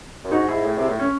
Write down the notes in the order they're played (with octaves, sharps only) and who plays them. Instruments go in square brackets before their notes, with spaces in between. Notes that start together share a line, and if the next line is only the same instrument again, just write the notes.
[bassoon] F#2
[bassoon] G#2 [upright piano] D#4 F#4
[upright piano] E4 G#4
[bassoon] A2
C3
A2
[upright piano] C#4